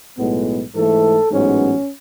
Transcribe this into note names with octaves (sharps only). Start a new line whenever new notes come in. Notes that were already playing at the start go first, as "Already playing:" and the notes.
B1 A2 G#3 B3
G#2 E3 A3 A4
A1 G#2 F#3 B3 C#4